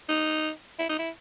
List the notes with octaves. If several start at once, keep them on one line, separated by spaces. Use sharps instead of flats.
D#4
E4
D#4
E4